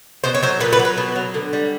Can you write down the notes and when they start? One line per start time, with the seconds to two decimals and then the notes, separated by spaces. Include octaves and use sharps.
0.24 B2 C5
0.35 C#5
0.43 F#3 C5
0.60 A#2 B4
0.73 B4
0.79 F#3
0.85 B4
0.98 B2
1.16 F#3
1.34 D3
1.53 G3